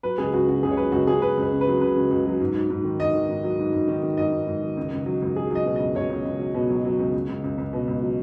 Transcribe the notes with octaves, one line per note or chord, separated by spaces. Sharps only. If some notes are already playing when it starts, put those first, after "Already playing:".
F#3 B4
C#2 G#4
C#2 F#4
C#3 F#4
C#2 G#4
C#5
F#3 B4
C#2 F#4
C#2 G#4
C#2 B4
C#2 B4
C#3
B4
F#3
C#3 B4
C#2
C#2
F#3
G#2
G#2
G#2
D#3
G#2 D#5
D#3
G#2
F#3
G#2
G#2
D#3
D#3
G#2 D#5
G#2
G#2
D#3
C#2
C#2
F#3
C#2
F#3 G#4
F#3 D#5
B2
C#2 D#5
C#2 C#5
C#2
C#2
F#3
B2
F#3
F#3
C#2
C#2
C#2
C#2
C#2
B2
C#2
F#3